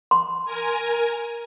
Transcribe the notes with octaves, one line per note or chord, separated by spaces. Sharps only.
C6
A#4 G#5